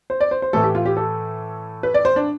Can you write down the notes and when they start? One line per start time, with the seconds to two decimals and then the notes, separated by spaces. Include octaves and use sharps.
0.10 C5
0.21 D5
0.31 C5
0.42 C5
0.53 A2 E3 A3 A4
0.64 G4
0.75 F4
0.86 G4
0.97 A4
1.83 B4
1.94 D5
2.05 C5
2.16 D4